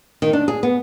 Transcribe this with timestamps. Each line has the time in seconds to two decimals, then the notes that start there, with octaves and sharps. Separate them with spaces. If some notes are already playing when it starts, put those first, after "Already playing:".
0.22 D#3
0.33 D4
0.48 G#4
0.63 B3